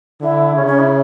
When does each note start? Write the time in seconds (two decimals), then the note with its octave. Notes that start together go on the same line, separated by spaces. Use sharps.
0.20 D3 E4
0.55 C#3 C#4
0.66 C#4
0.79 E4